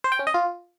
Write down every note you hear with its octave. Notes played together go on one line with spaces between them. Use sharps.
C5
G5
C#4
D#5
F4